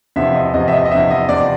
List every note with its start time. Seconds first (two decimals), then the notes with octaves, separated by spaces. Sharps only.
0.16 E2 C3 F3 E5
0.35 D#5
0.54 E2 C3 F3 D#5
0.68 E5
0.72 D#5
0.85 D#5
0.91 E2 C3 F3 E5
1.11 D#5
1.29 E2 C3 F3 D5